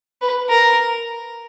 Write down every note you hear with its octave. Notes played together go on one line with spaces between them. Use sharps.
B4
A#4